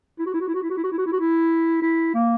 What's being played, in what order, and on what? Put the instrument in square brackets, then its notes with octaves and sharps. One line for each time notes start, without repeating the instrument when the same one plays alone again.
[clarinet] E4
F#4
E4
F#4
E4
F#4
E4
F#4
E4
F#4
E4
F#4
E4
F#4
E4
E4
A#3